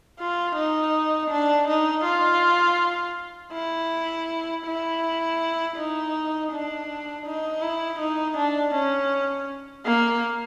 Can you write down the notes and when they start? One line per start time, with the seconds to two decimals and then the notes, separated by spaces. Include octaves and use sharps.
0.19 F4
0.56 D#4
1.30 D4
1.68 D#4
2.05 F4
3.54 E4
4.66 E4
5.77 D#4
6.51 D4
7.26 D#4
7.62 E4
8.00 D#4
8.37 D4
8.74 C#4
9.86 A#3